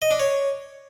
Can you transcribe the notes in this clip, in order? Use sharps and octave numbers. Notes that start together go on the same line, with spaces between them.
D#5
D4
C#5